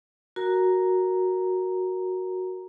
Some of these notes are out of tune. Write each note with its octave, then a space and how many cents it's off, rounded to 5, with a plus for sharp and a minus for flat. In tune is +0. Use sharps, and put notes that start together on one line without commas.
F#4 +0 A#4 +0 A#5 +0